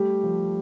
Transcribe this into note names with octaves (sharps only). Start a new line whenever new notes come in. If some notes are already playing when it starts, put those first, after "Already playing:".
Already playing: G3 A3 G4
F3